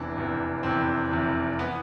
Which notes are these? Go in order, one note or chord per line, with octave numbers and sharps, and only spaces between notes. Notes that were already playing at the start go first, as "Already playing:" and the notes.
Already playing: F1 E2 C3 E3 D4
F1 E2 C3 E3
F1 E2 C3 E3 C4
F1 E2 C3 E3
E3 B3